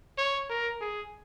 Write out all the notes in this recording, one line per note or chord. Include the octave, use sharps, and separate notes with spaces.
C#5
A#4
G#4